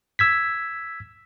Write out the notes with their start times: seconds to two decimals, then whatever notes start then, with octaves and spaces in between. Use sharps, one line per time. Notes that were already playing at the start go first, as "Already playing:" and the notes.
0.19 E6 G#6 B6